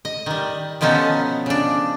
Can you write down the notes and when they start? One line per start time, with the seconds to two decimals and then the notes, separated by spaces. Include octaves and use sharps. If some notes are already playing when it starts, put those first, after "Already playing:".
0.05 D#5
0.26 D#3 G3
0.81 B2 F3 B3 C#4 D#4 A4
1.46 C#3 D4